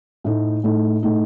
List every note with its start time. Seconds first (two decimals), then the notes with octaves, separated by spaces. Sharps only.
0.24 A2 A3 D#4
0.64 A2 A3 D#4
1.03 A2 A3 D#4